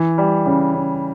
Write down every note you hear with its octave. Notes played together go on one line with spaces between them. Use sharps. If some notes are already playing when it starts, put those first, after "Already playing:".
Already playing: E3
G3
C#3
C#3